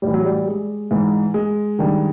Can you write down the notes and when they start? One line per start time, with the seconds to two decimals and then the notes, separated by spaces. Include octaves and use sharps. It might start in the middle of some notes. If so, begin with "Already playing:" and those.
0.02 A2 E3 G3
0.14 F#3
0.25 G3
0.47 G#3
0.91 G#2 E3
1.34 G#3
1.79 G2 D#3